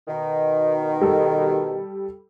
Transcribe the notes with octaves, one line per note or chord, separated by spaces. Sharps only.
B2 D#3
G3 A4